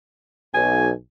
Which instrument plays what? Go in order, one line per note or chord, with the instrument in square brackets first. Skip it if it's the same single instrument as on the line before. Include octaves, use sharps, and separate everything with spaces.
[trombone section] B1 [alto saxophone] G#5